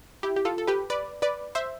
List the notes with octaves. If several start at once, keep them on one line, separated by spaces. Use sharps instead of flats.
E4 G4
G4
F4 A4
A4
G4 B4
B4 D5
B4 D5
C5 E5